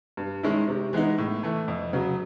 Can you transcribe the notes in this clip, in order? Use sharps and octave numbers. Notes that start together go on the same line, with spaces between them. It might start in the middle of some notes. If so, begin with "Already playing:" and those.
G2
D#3 G#3 C#4 E4
C3
E3 G#3 B3 D#4
A2
E3 A3
F2
C#3 F#3